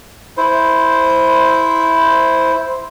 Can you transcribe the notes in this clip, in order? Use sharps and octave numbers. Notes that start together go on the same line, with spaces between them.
E4 C5